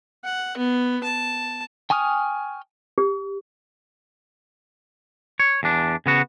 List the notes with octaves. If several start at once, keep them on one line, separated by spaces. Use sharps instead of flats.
F#5
B3
A5
G5 G#5 C#6 D#6 F6
G4
C#5
E2 D4
C#3 B3 F#4